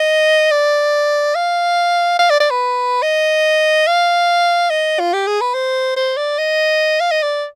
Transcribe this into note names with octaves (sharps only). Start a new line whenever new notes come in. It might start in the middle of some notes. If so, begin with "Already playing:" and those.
Already playing: D#5
D5
F5
F5
D5
D5
B4
D#5
F5
D#5
F4
G4
G#4
B4
C5
C5
D5
D#5
F5
D#5
D5